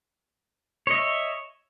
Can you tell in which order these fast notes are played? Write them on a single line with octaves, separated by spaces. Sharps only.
C#5 D#5 E5